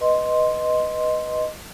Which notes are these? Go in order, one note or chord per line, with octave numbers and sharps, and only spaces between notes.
B4 D#5 C6